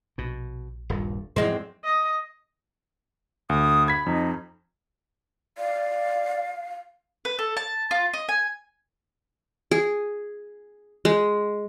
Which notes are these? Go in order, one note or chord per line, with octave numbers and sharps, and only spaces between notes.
A#1 B2
D#1 G2 A#2
E2 G#2 F3 F#3 G#3 C4
D#5
D2 D#6
B5 G#6 B6
F2 D#4
D5 F5
B4
A4
A5
F4
D#5
G#5
G#4
G#3